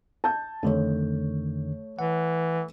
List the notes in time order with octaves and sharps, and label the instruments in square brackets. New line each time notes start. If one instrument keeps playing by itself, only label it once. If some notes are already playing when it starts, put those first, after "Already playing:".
[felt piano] A5 G6
[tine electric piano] F2 D3 D#3 [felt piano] A3 C#5
[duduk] E3 [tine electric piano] F#5